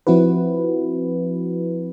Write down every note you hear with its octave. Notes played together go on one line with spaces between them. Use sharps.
F3 C4 E4 F#4 B4